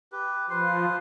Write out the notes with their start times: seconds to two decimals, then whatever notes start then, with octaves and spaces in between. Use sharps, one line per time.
0.12 G4 B4
0.50 F3 B4 C5